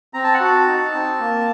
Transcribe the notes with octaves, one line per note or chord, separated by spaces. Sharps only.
C4 A#5
A5
F#5
F#4 A5
D#4
C4
A#3